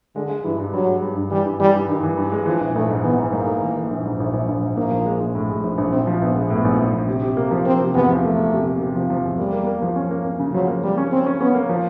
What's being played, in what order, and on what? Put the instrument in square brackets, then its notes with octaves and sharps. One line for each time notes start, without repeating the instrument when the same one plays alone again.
[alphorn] D3 [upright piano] G#3
[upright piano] G#3
[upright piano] G2 [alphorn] E3
[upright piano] G2
[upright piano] G2 [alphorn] F#3
[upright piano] G#3
G2
G2
[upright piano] E3 [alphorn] G3
[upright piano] G2
[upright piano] E3 [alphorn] G3
[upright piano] G2
[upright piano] G2 [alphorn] D#3
[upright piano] E3
G2
G#3
[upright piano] E3 [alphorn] F3
[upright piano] A#1
[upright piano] A#1 [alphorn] A3
[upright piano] G#2
[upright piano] E3 [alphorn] B3
[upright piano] G#2
[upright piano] G#2 [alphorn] A#3
[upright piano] A3
E3
E3
A#1
G#2
A#1
A#1
A#1
G#2
[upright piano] A#1 [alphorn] A#3
[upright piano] F3
G#3
A#1
A2
G#3
A#1
A#1
[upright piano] A#1 [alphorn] C4
[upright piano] F3
[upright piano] A#1 [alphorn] B3
[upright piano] G#3
[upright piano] A2 [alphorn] B3
[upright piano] A#1
A#1
A#1
C3
C3
A#3
F3
[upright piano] A#3 [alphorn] C4
[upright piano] C3
[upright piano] E2 [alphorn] B3
[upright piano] F3
[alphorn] A3 [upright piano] A#3
[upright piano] A#3
C3
A#3
C3
F3
F3
E2
[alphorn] G3 [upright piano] A#3
[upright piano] A#3
A#3
F3
C#4
A#3
C#4
C#3
[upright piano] F3 [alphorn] F#3
[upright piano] A#3
[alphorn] G3 [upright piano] A#3
[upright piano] C#4
[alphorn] C4 [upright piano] C#4
[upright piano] C#4
[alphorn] B3 [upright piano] C#4
[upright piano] A#3
F3